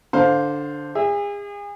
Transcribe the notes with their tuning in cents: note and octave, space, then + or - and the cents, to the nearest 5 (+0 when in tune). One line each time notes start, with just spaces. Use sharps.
D3 +0 C5 +0 F5 +20
G#4 -35 E5 -5